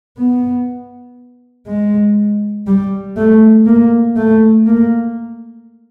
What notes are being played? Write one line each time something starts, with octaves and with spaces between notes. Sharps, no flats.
B3
G#3
G3
A3
A#3
A3
A#3